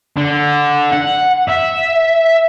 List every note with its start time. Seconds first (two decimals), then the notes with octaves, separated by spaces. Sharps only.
0.17 D3
0.92 F#5
1.48 E5